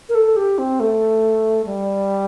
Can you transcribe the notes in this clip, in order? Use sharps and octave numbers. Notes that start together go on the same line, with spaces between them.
A#4
A4
G4
C4
A3
G3